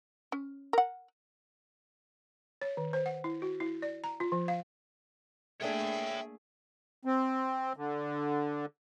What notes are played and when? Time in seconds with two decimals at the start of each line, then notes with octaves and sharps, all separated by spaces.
0.32 C#4
0.73 A#4 F#5
2.61 C#5
2.77 D#3
2.93 C5
3.06 F#5
3.24 E4
3.42 F#4
3.60 E4
3.82 D5
4.04 A#5
4.20 F4
4.32 F3
4.48 F5
5.61 A3 A#3 D4 G#4 C#5 E5 G5
7.05 C4
7.76 D3